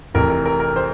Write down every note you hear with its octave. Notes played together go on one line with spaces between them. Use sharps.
F1 F2 E3 A#4
A#4
A#4
A#4
C5